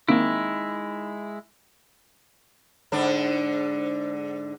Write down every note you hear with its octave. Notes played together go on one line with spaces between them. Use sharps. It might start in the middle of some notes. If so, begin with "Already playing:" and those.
D#3 G#3 A#3 C4 E4 D7
G#2 D3 D4